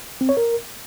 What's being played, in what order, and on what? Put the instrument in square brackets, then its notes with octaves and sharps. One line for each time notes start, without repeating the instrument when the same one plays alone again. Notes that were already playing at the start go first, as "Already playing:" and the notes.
[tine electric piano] C4
C#5
A#4